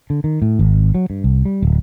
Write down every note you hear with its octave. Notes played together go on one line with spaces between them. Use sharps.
D3
D#3
A2
G#1
F#3
G2
C2
G3
D1